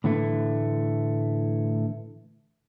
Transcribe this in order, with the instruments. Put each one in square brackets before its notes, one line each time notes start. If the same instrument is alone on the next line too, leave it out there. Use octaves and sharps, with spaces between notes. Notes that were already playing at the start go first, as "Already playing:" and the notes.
[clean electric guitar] A2 D3 E3 A3